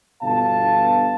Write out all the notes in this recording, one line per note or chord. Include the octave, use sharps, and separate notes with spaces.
G1 B2 F5 A5